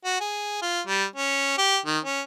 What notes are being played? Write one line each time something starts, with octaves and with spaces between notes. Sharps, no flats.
F#4
G#4
F4
G3
C#4
G4
D#3
C#4